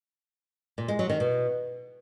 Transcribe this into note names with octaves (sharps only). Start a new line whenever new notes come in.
A#2
G#3
F#3
D#3
B2